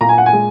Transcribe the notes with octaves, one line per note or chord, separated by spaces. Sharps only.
A#2 A#5
G#5
F#5
G#5
G#3